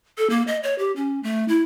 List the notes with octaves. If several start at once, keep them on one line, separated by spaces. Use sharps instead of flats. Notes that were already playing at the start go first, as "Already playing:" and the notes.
A4
A#3
D#5
C#5
G4
C#4
A3
E4